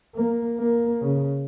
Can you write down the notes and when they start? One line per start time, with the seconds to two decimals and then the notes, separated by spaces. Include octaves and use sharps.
0.15 A#3
0.58 A#3
1.01 C#3